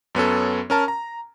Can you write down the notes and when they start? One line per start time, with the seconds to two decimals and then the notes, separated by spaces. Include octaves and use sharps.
0.15 F#2 B3 C#4 A4
0.70 C#4 A#4 A5
0.88 A#5